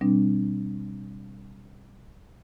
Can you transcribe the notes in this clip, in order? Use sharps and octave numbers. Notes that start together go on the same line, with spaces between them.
B2 G3 C4 D4